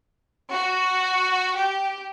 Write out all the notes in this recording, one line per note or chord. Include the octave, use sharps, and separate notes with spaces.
F#4
G4